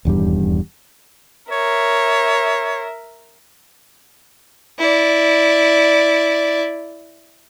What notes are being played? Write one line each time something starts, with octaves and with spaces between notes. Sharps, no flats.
D#1 E2 G2 G3
A#4 C#5 E5
E4 D5